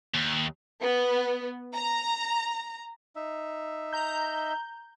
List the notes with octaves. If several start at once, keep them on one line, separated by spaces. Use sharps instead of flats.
D#2
B3
A#5
D#4 E5
A#5 G6